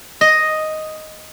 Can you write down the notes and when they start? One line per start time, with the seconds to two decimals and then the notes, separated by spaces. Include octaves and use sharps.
0.21 D#5